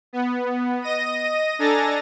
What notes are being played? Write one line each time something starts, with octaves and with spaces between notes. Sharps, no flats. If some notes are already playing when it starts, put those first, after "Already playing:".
B3
D#5 A#6 D#7
D4 A4 G#5 A#5 A6 A#6